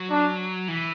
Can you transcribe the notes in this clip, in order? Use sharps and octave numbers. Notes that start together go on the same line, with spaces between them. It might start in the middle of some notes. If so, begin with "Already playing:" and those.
Already playing: F#3
D4
E3